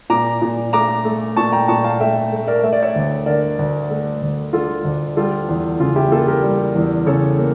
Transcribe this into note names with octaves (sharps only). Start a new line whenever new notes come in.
A#2 A#5 D6
A#2
A3 A#5 D6
A3
A#2 A5 C#6
G5 A#5
A#2 A5 C#6
F5 A5
A3 E5 G5
A3
A#4 D5
A3 E5
D5
C#5 E5
D2
D3 A#4 D5
D2
A3
D2
D3 F4 A4
D2
G3 F4 A4
E2
C#3 F4
E4 G4
A#3 F4 A4
G4 A#4
G3
E2
C#3 A4 C#5
A#3